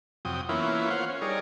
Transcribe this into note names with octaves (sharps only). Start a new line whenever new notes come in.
F2 C3 F#3 G5 D#6
E3 A#3 B3 C#4 E4 F4
F4 C5 C#5 F5 F#5
C#4
G3 D#4 G#4 A#4 C#5 D5